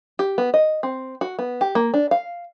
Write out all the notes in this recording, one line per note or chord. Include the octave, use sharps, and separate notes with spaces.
G4
B3
D#5
C4
F#4
B3
G4
A#3
D4
F5